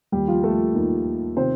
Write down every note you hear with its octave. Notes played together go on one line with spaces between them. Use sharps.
D#2 D#3 G3 G4
F3 F4
A3 A4
D#2 D#3
C3 D#3 C4 C5